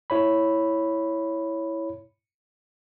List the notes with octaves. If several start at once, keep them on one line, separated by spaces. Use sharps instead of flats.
E4 C#5 B5